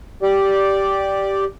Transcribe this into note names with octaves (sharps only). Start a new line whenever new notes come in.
G4 D5